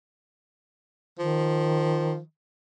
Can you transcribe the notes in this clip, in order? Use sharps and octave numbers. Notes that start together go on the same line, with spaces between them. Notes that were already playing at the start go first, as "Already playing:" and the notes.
D#3 F3